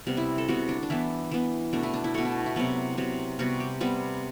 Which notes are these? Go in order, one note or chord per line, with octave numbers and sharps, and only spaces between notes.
C3 G3 B3
E4
A4
C3 G3 B3 F#4
D4
D4
E3 B3 E4
E3 B3
B2 A3 D4
E4
D4
E4
B2 A3 F#4
E4
E4
C3 F#3 B3
C3 F#3 B3
C3 G3 B3 F#4
G4
C3 G3 B3